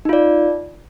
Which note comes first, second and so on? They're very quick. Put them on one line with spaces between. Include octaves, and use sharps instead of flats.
D#4 F4 D5